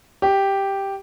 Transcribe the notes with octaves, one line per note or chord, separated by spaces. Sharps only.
G4